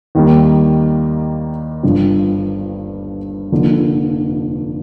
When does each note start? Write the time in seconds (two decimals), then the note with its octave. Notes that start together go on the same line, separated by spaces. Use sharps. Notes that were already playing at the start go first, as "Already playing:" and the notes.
0.15 D#2 D#3 G3 A#3
1.83 G1 G2 F3
3.52 F1 F2 D3 F3 A#3